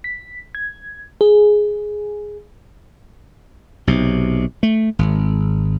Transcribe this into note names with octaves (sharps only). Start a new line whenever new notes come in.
B6
G#6
G#4
B1 C3
A3
G#1